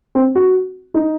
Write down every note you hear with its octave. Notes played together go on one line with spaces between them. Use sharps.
C4
F#4
D#4